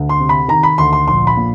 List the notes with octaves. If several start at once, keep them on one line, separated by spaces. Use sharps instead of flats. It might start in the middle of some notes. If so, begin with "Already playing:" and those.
Already playing: D2
C6
C3
B5
D#3 A#5
B5
D2 C6
C6
A#1 C6
B5
A#2